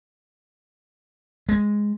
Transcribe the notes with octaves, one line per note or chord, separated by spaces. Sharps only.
G#3